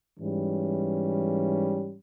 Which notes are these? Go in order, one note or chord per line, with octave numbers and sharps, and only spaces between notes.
G#2 E3 G3 C#4